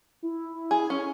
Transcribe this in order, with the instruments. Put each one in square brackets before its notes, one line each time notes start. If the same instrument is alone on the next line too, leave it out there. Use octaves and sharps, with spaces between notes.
[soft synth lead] E4
[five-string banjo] G#4
C#4